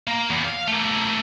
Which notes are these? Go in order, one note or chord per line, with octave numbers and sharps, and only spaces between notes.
A#3
E2
F5
A3 A#3